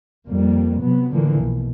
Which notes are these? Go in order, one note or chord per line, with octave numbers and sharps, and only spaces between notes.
F2 G3 A#3
C3 F#3 B3
A2 D3 E3 F3 A#3
B1 B2